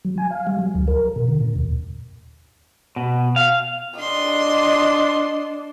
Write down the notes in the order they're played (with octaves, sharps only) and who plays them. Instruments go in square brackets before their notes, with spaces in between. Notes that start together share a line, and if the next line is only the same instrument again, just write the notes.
[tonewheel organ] F#3
G#5
F5
G3
F#3
D2
A#4
B2
D3
A#2
D#2
[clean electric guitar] B2
F5
[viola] D4 [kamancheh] D#5 [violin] C6